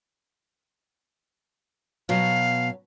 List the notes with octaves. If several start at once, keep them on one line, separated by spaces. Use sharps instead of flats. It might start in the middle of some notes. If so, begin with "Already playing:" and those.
B2 F#3 F5